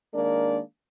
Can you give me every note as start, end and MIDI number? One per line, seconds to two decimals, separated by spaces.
0.13 0.59 51
0.13 0.59 56
0.13 0.59 58
0.13 0.59 62
0.13 0.59 70
0.13 0.59 74